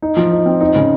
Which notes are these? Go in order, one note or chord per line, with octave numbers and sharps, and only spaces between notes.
D#4
F3
D#4
C4
D#4
C#3